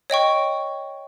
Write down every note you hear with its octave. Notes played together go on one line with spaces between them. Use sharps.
C#5 D#5 G5 C#6